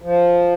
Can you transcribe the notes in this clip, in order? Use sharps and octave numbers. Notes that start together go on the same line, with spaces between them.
F3